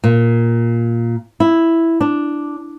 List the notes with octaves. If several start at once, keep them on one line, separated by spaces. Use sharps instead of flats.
A#2
E4
D4